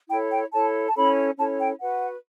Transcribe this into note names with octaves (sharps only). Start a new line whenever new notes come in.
E4 A4 C#5 G5
G5
E4 A4 C#5 A5
A5
C#4 E4 A4 C#5 B5
C#4 E4 A4 C#5 A5
G5
F#4 B4 F#5